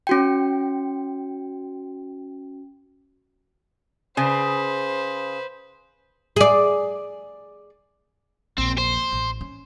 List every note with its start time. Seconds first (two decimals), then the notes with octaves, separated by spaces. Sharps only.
0.07 C#4 F#4 G5
4.17 C#3 B4 C5
6.36 G#4 D5
8.58 A#1 E2 C4
8.78 C5
9.12 A1 E4
9.41 C#4